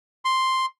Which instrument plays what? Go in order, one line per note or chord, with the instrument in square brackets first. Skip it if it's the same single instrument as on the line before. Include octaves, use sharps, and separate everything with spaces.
[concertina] C6